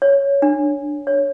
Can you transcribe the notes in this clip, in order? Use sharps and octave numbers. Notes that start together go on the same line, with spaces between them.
C#5
D4
C#5